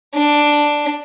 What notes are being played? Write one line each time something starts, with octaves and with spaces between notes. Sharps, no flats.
D4